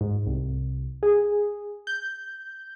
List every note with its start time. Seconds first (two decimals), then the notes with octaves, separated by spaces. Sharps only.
0.01 G#2
0.26 C2
1.03 G#4
1.87 G6